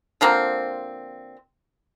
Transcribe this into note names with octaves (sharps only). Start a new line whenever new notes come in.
D3 F3 A#3 C4